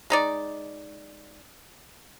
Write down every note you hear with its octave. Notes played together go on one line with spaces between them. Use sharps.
G#3 D#4 D5